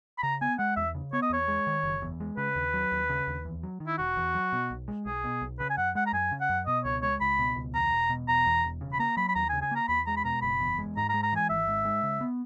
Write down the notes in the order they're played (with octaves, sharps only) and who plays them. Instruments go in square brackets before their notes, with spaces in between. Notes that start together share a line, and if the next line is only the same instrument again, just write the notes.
[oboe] B5
[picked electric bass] C#3 [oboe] A#5
[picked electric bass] B3 [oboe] G#5
[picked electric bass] G#3 [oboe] F#5
[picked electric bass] E2 [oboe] E5
[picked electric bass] C#3
[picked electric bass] B3 [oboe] C#5
[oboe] D#5
[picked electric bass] E2 [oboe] C#5
[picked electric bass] G#3
D#3
F#1
E2
G#3
[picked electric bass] C#3 [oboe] B4
[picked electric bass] D#2
F#3
D#2
C#3
D#2
E2
F#3
D#3
[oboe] E4
[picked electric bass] E1 [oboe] F#4
[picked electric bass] E2
F#3
B2
B1
G#3
[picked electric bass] B1 [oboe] G#4
[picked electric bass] B2
B1
[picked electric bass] C#3 [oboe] B4
[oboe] G#5
[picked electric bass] F#2 [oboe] F#5
[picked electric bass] G#3 [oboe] F#5
[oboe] A#5
[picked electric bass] F#2 [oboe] G#5
[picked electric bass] C#3
[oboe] F#5
[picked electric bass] F#2
[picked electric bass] B2 [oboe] D#5
[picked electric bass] C#2 [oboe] C#5
[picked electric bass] G#3 [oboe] C#5
[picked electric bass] C#2 [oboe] B5
[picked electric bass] B2
C#2
[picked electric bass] E2 [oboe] A#5
[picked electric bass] E1
B2
[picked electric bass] E1 [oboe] A#5
[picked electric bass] E2
E1
C#3
[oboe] B5
[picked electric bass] A#3 [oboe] A#5
[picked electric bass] F#3 [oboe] B5
[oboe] B5
[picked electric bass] D#2 [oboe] A#5
[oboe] G#5
[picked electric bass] C#3
[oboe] G#5
[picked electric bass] A#3 [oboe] A#5
[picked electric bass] E2 [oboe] B5
[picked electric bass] G#3 [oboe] A#5
[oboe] B5
[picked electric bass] B2 [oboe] A#5
[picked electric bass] F#1 [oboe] B5
[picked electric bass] E2
G#3
[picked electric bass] G#2 [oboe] A#5
[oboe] A#5
[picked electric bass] G#3
[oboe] A#5
[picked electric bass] E3 [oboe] G#5
[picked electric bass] G#1 [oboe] E5
[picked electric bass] G#2
G#3
C#3
B3